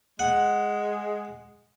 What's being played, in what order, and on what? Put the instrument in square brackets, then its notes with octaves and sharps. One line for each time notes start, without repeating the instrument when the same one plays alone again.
[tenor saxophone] G#3 [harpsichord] F#5